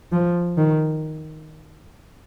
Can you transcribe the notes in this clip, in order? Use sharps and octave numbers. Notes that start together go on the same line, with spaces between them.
F3
D#3